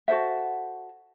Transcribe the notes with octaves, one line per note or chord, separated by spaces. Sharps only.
F#4 A4 C5 E5